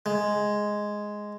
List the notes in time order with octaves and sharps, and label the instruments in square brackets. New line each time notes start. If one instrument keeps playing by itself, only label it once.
[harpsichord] G#3